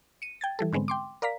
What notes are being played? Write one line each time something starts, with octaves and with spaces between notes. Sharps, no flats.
C#7 D#7
G5 G#6 A6
E3 G3 A4
G#2 D3 G#3 B3 C4
G5 C6 D6
A#4 D5 F5 A#5 B6